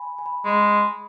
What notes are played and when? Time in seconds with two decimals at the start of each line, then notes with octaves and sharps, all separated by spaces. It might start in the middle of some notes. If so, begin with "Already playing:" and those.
Already playing: G#5 B5
0.18 G#5
0.26 B5
0.45 G#3 B5